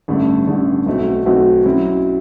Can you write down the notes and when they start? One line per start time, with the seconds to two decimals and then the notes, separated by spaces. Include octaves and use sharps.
0.08 A1 G2 D3 A3
0.47 A1 G2 D3 A3
0.86 B1 B2 A3 C4 F#4
1.25 B1 B2 A3 C4 F#4
1.65 F#2 F#3 C4 E4